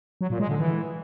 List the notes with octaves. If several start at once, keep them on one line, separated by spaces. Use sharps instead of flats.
F#3
A#2
G#3
D3
E3